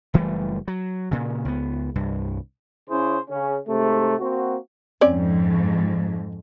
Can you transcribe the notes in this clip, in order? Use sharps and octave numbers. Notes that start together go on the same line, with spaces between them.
F#1 E3 G3 A3
F#3
A#2 C#3
C#2 B3
C2 G2
C#3 C#4 E4 G#4 C5
C#3 C#4
G#2 C3 A3
A#3 C4 F#4
F2 G#2 C4 C#4 D5